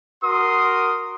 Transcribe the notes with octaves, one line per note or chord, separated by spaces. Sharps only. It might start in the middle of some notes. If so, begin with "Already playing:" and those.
F#4 A#4 C6 D#6